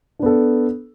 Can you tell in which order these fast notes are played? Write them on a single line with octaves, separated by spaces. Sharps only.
D4 B3 A4